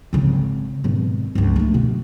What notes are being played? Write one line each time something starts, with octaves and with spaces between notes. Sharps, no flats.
G#1 C#3
G#1 B2
C#2 G2
A3 A#3
B2